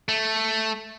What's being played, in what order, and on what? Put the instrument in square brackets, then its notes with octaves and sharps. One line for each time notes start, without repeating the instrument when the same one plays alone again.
[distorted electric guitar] A3